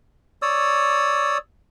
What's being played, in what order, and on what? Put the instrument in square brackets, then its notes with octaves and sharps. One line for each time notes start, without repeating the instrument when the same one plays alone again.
[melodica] C#5 D5 D#6 E6